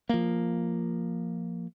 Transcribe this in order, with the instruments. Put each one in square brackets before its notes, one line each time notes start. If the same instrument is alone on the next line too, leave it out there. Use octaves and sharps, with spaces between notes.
[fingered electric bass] F3 A#3